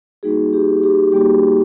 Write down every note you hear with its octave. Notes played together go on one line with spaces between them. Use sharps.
G3 A#3 D#4 F#4 G#4
G4
G4
G3 A#3 D#4 F#4 G4